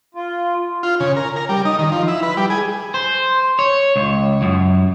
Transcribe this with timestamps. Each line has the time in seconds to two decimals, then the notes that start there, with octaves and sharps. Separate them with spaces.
0.15 F4
0.83 F4
1.00 C#3
1.17 A#4
1.36 A#4
1.49 G3
1.65 D#4
1.79 D#3
1.92 F3
2.08 E4
2.23 B4
2.37 G3
2.50 G#4
2.94 C5
3.59 C#5
3.96 C#2
4.42 F#2